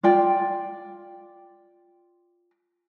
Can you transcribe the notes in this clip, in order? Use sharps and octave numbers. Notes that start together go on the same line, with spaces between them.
F4 D5 G5